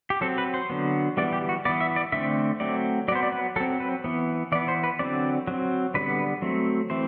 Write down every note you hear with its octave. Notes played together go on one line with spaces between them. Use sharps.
G4
F#3 C4 A4
B4
C5
D3 F#3 B3
E3 G3 B3 D5
G4
F#4
E3 B3 D5
E5
D5
D3 A3 C4 E5
F#3 A3 C4 D5
F#3 B3 C5 D5
D5
B4
F#3 C4 A4
B4
E3 B3
E3 B3 D5
C5
B4
D3 F#3 C4 D5
F#3 C4
D3 G3 B3 B4
F#3 A3 C4
E3 A3 C4 C5